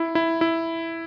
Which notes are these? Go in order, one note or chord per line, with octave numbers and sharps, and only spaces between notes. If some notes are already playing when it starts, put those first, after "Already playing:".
Already playing: E4
E4
E4